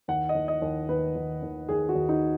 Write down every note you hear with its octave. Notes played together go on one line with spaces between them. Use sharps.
D#2 F#5
D#5
D#2
D#5
D#2
D#2 B4
D#2
D#2
D#2 G#4
F#4
D#2
D#4